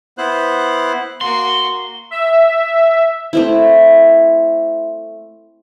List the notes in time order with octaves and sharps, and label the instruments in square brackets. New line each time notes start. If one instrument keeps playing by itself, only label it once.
[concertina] B3 E4 C5 F#6
[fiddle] A#3 F#4 [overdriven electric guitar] C6
[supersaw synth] E5
[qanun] A3 C4 E4